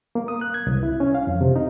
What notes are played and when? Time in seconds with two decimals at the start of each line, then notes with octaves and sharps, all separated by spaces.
0.15 A#3
0.28 D#6
0.41 F#6
0.54 G#6
0.67 C2
0.83 E4
1.00 C#4
1.15 F5
1.27 F2
1.41 C3
1.56 D#4